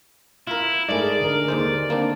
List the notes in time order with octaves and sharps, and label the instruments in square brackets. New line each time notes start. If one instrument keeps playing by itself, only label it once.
[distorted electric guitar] E4 [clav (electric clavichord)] F4 A#4
[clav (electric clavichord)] G#2 G#3 A3 [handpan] G#4 A#4 D#5 [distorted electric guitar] D5
[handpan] D3 A#4
[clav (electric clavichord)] D#2 G#3 C5
A#3 C4 D4